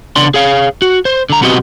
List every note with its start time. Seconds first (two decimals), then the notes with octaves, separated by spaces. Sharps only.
0.16 C#3 B3 D4 D5 C6
0.34 G#4 C#5 F5
0.82 F#4
1.05 C5
1.30 D3 A#5
1.41 B1 B3 C4 F#4 G4 D#5